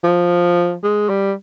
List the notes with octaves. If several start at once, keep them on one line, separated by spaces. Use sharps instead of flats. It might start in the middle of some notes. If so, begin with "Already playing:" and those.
F3
G#3
G3